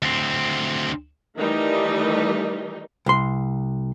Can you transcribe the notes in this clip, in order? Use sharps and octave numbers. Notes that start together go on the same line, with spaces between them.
D2 C4
D#3 E3 G3 A3 D#4
C2 C6